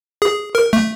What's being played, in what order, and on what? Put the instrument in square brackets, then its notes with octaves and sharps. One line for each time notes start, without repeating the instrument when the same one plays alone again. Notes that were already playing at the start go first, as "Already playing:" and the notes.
[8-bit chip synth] G#4
A#4
A3